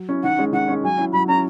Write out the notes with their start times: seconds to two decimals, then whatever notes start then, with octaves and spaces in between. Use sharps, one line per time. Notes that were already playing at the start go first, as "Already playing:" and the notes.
Already playing: F#3
0.09 C#4 E4
0.23 D#3 F#5
0.38 G#3 C#4
0.53 D#3 F#5
0.68 G#3 C#4
0.83 F#3 G#5
0.98 C#4 E4
1.13 F#3 B5
1.28 C#4 E4 A#5